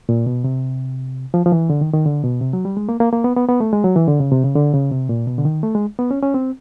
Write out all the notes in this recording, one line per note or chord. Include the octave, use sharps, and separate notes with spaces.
A#2
B2
C3
F3
F3
E3
D3
D#3
D#3
D3
B2
C3
F#3
G3
G#3
A#3
A#3
A#3
B3
B3
B3
A3
G#3
F#3
E3
D3
C#3
C3
C#3
D3
C#3
C3
A#2
B2
D3
D#3
A3
G#3
B3
C#4
C#4
C4